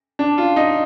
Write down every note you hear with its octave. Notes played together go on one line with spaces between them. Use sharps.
D4
F4
D#4